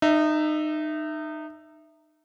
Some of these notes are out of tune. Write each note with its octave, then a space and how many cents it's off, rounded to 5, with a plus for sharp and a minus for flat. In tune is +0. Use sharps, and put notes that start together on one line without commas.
D#4 -25 E5 +0